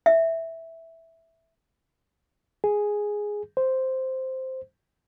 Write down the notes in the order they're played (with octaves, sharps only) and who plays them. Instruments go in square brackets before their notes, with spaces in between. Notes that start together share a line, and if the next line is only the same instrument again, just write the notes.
[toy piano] E5
[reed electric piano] G#4
C5